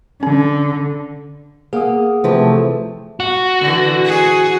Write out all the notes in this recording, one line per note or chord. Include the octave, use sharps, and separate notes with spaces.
D3 C#4
A#3 G#4 F#5 D#6
C3 E3 F3 A3
F#4
D3 E3
G#4